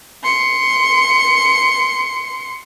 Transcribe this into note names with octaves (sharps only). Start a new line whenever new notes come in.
C6 C#7